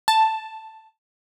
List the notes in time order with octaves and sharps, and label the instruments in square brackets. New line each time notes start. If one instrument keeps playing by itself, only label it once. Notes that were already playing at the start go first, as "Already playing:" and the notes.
[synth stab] A5